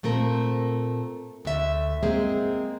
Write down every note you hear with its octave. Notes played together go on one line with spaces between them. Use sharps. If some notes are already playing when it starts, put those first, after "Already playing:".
A#2 A3 C4 A#4
D2 E5
G#3 A#3 C4 G#4